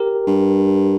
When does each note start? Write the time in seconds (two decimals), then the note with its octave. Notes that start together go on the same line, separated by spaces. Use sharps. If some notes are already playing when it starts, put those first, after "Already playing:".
Already playing: G4 A#4
0.27 G2